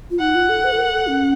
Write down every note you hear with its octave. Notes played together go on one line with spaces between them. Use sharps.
F4
D#4 F#5
F4
A4
C5
A4
A#4
A4
C#4